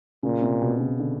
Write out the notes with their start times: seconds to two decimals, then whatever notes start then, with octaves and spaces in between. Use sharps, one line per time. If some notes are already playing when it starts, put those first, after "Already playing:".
0.23 A#2 C#3
0.42 C3
0.62 B2
0.80 C#3
0.99 D3